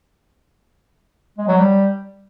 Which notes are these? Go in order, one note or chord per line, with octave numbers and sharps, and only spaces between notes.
G#3
F#3
G3